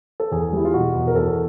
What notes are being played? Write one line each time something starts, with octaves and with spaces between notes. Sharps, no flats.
A4
E2 G#4
G3 E4
F4
B2 F#4
E2
A#4
E2 A4